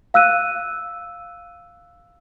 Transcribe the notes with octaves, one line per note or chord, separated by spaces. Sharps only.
F5 E6 F#6 D#7